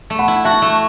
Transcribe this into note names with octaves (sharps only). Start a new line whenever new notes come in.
A3
F#5 B5
E4
F#4 E5 A5
A3